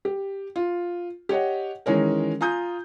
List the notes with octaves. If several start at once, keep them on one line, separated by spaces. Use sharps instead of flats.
G4
F4
G4 C#5 D#5 F#5
D#3 E3 G#3 C#4 A#4
F4 G#5 A#5 D#6 G6